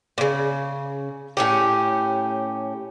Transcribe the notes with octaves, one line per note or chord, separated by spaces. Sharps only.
A#2 C#3
A2 C#4 G4